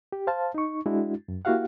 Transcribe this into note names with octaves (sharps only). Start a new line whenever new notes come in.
G4
C5 F5 A5
D#4 C#6
G#3 D4 E4 F#4
F#2
A#3 E4 F#4 G4 F5 F#5